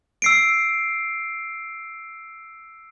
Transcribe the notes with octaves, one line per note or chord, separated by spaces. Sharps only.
E6 C7 D7